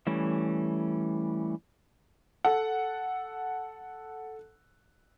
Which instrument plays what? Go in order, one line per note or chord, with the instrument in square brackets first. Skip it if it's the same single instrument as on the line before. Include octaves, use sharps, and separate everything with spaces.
[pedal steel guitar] E3 G3 A3 C#4
[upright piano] A4 F#5